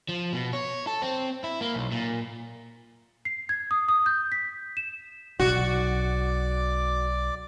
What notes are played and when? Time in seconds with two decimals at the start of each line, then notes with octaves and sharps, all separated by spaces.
0.09 F3
0.33 B2
0.53 C#5
0.87 A4
1.02 C4
1.44 E4
1.61 A#3
1.75 B1
1.92 A#2
3.25 C7
3.49 G#6
3.71 D#6
3.89 D#6
4.06 G6
4.32 B6
4.77 E7
5.40 B1 F#4 D5 D6